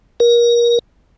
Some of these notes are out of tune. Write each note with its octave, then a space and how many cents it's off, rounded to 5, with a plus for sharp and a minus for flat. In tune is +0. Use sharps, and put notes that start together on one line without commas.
A#4 +25